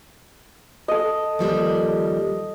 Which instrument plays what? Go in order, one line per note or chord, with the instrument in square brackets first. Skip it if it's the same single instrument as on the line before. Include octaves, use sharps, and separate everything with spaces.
[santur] A4 D#5
[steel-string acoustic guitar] D#2 F3 G3